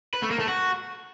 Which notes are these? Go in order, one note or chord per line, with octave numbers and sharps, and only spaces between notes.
B4
A3
A#3
A3
F#4